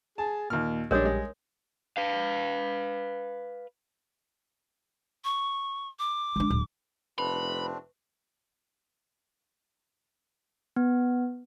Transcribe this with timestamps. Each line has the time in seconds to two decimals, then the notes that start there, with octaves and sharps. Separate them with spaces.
0.18 G#4 A5
0.50 D#2 A#2 F6
0.91 A#1 G3 G#3 D4 A#4 C#5 D#6
1.05 G#3
1.97 B4 F5
5.24 C#6
5.99 D6
6.36 G#3 D4
6.50 D1
7.19 F1 A3 C4 D4 B4 B5
10.76 B3